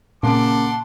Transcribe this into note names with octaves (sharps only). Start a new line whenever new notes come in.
A#2 C#3 A#3 F#5 A5 C6 D6